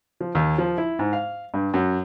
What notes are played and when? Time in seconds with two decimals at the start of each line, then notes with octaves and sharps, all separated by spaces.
0.21 F3
0.35 D#2
0.58 F3
0.78 E4
0.99 G#2
1.13 F5
1.54 G2
1.74 F#2